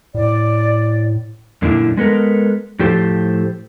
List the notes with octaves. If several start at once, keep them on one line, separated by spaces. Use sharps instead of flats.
A2 D5
F#2 A#2 D3 D4 E4
G#3 B3 A4 A#4
A2 F3 G4 A4 C5